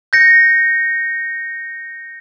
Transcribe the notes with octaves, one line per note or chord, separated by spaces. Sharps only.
G6 A#6 C#7